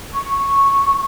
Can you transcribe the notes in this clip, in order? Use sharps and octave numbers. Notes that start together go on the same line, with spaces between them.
C#6